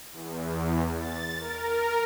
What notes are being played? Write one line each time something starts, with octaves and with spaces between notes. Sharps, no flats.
E2
A6
A#4